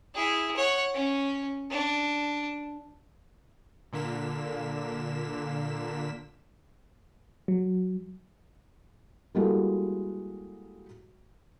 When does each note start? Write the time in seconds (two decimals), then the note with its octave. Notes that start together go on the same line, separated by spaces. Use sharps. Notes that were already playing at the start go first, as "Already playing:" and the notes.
0.15 E4 G#4
0.56 C#5 F#5
0.94 C#4
1.70 D4
3.93 A#2 D3 A#3 B6 E7
7.48 F#3
9.35 G3 G#3 A#3 E4 F#4 A4